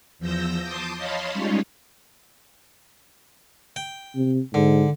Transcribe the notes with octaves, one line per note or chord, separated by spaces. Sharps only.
E2 F3 E6 G6 A#6
A5 C6 D6 D#6 G6
C#5 D#5 F5 A5 B5 C6
G3 G#3 C#4 D#4 F4 C#5
G5
C3
G#2 D3